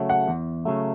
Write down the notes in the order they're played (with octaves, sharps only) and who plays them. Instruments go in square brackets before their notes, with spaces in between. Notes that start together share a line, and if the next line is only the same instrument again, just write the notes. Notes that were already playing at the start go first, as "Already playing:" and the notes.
Already playing: [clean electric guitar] C#3 F#3 A3
[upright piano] F#5
[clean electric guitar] E2
C#3 F#3 A3